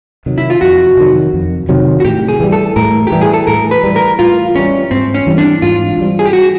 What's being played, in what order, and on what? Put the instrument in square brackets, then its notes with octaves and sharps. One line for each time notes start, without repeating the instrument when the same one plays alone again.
[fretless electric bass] C3 D#3 F#3
[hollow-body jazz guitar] E4
F4
[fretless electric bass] F2 [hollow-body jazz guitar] F#4
[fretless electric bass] C3 D#3 F#3
F2
C3 D#3 F#3
[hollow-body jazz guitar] F#4
[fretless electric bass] A2 [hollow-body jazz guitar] G4
[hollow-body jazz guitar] G#4
[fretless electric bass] E3 G3
[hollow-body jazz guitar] A4
[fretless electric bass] A2 [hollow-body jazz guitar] A#4
[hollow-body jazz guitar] G4
[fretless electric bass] E3 G3
[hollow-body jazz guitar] G#4
A4
[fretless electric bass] A2 [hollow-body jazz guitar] A#4
[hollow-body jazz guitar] B4
[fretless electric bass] E3 G3
[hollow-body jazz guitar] A#4
[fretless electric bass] A2 [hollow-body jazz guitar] F4
[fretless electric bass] E3 G3 [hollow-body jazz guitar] C#4
[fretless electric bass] G#2 [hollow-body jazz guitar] C4
[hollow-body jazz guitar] C#4
[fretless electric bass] E3 G3 C4
[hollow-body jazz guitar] D4
[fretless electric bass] G#2 [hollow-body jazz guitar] F4
[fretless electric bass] E3 G3 C4
[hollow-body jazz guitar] G#4
G4
F#4